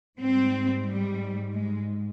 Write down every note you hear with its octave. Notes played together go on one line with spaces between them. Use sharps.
G#2 G3 C4
G3
G#3